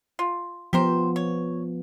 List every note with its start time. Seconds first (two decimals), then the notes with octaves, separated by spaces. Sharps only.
0.19 F4
0.73 F3 B3 G4 A#4 C5
1.16 C#5